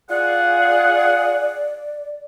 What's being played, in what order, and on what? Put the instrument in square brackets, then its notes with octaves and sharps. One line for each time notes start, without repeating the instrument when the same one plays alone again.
[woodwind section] F4 G#4 F#5 [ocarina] D5